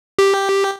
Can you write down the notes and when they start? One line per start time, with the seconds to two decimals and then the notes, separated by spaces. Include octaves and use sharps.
0.19 G4